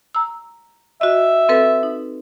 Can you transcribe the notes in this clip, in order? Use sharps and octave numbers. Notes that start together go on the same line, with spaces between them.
A#5 E6
F#4 D#5 E5
C4 A4 B4
D#4